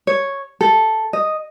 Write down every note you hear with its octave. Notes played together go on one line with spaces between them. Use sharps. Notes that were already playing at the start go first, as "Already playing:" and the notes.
C#5
A4
D#5